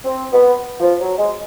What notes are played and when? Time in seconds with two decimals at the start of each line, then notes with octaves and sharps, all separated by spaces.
0.04 C4
0.32 B3
0.80 F3
0.99 F#3
1.18 G#3